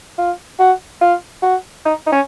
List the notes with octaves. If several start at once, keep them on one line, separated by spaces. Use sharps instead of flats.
F4
F#4
F4
F#4
D#4
D#4
C#4